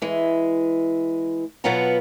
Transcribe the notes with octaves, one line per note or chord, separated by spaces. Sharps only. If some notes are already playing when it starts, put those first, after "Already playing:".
E3 G#3
B2 F#3 B3 F4 F#5 A#5